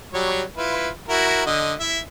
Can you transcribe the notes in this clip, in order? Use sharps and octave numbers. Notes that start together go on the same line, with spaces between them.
F#3 G3 C#5
E4 F4 B4
E4 F#4 A#4
D3 D#5
E4 E5